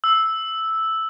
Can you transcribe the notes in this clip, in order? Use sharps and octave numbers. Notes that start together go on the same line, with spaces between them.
E6